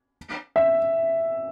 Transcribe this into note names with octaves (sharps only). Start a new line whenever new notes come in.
E5